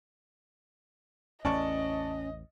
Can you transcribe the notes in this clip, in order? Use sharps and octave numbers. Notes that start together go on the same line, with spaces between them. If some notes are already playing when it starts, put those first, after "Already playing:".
A1 E2 C#4 D5 D#5 A5 C#6